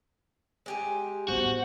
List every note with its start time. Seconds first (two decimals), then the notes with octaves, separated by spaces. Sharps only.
0.66 G#3 G4 G#5
1.28 A1 E2 B3 F#4 C5 F#5